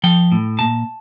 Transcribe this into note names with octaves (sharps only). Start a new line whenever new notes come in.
F3 G5
A2
A#2 A5